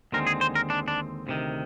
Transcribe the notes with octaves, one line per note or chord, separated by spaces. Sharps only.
D#2 D3 G#3 C4 A#4
G#4
C5
A#4
D4
D4
D2 C3 D#3